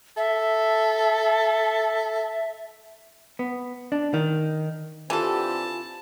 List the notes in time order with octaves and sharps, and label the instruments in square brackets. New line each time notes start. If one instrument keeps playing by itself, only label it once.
[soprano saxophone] A4 [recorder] E5
[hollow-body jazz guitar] B3
D4
D#3
[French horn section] D3 C4 G4 [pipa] E3 A4 [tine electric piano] F4 G#5 [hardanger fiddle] A5